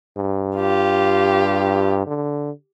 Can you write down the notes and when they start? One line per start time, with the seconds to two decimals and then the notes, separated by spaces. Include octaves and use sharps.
0.17 G2
0.57 F4 G4
2.06 D3